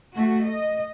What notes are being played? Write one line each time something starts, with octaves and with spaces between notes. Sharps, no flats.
A3 F#4
D#5